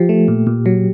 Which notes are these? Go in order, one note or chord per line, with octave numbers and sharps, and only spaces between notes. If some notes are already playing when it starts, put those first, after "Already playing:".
Already playing: F3 G4
A3
A#2
A#2
F#3